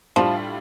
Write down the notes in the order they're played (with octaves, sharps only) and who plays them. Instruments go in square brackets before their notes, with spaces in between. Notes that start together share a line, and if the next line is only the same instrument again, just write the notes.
[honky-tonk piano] A2 G3 D4 F4 [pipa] F3